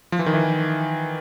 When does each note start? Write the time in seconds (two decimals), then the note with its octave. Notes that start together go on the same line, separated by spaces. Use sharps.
0.12 F3
0.19 E3
0.26 D#3
0.34 E3